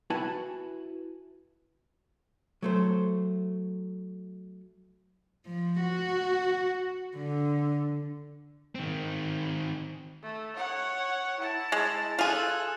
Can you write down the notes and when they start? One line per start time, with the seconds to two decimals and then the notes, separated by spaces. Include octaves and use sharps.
0.10 E4 F#4 B4 G#5 A5
2.62 F#3 A3 C5
5.46 F3
5.80 F#4
7.16 D3
8.75 D#3 C4
10.23 A3
10.56 C#5 F#5
11.40 E4 A5
11.72 G#3
12.19 F4 G#4 A4 F#6